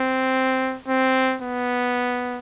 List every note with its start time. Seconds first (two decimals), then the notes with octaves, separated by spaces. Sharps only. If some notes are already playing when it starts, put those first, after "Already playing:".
Already playing: C4
0.88 C4
1.42 B3